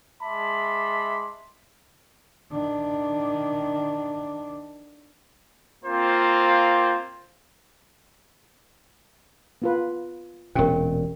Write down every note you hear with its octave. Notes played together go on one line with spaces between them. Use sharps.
G#3 E5 A5 B5 C6 D6
D#3 D4
A#3 C4 F4 C5
B3 F4 B4
E1 A#2 C#4 G4 A#4